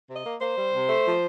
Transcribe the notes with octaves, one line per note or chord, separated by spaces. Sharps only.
C3
D#5
A#3
A#3 C5
G3
C3
A3
F3